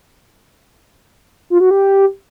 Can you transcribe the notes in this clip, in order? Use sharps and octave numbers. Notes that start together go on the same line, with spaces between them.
F4
F#4
G4